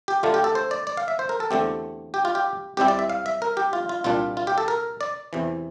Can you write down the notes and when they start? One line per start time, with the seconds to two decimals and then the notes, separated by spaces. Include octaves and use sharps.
0.08 G4
0.23 D2 D3 A3 F4
0.34 G4
0.44 A4
0.55 C5
0.71 D5
0.87 D5
0.97 F5
1.08 E5
1.19 C5
1.29 A#4
1.40 A4
1.51 E2 D3 A3 C4 G4
2.14 G4
2.25 F4
2.35 G4
2.77 C2 C3 G3 C4 E4 G4
2.88 D5
2.99 E5
3.10 F5
3.26 E5
3.42 A#4
3.57 G4
3.73 F4
3.89 F4
4.04 C2 A#2 G3 D4 F4
4.37 F4
4.47 G4
4.58 A4
4.68 A#4
5.01 D5
5.33 E2 C3 E3